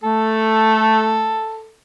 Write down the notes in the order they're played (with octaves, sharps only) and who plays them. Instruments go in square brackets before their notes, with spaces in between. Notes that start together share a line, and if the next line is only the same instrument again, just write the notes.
[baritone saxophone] A3 [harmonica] A4